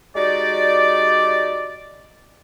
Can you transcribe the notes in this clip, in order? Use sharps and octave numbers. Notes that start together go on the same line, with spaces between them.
G#3 D#4 F#4 G4 D5